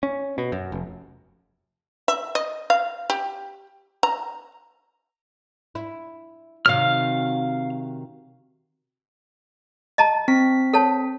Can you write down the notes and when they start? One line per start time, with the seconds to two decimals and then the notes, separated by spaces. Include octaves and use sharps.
0.03 C#4
0.38 B2
0.52 F#2
0.72 F1
2.08 E5
2.35 D#5
2.70 F5
3.10 G4
4.03 A#5
5.75 E4
6.66 C3 D#3 F#3 F5 F6
9.98 D#5 A5 A#5
10.28 C4 B6
10.74 A4 C#5 A5